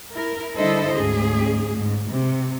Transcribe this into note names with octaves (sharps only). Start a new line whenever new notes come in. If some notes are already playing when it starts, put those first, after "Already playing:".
E4 A#4
D3 G3 E4 A4 C5 D#5
D2 G#2 C#4 G#4
G#2
C3